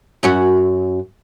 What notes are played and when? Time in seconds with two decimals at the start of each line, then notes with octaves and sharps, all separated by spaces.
0.23 F#2 C#4 F#4